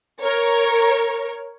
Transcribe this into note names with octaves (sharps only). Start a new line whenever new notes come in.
A#4 C#5